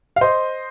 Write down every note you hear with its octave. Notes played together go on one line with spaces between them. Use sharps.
F5
C5 D#5